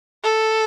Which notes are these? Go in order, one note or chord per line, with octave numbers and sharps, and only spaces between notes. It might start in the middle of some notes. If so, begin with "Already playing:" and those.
A4